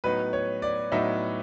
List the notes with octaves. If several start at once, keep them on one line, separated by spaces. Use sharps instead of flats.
A2 F#3 B3 D#4 B4
C#5
D5
A2 F#3 B3 D#4 E5